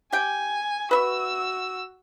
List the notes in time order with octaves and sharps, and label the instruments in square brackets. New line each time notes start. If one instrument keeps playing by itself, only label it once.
[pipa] G4 G5 [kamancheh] G#5
[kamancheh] F#4 E6 [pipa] B4 E5 C#6